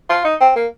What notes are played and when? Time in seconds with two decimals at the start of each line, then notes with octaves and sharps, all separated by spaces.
0.09 F4
0.25 D#4
0.40 C4
0.56 A#3